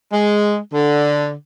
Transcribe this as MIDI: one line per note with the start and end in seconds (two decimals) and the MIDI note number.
0.12 0.58 56
0.73 1.33 50